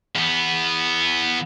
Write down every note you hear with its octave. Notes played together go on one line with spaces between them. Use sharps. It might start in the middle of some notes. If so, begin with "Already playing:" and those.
E2 B3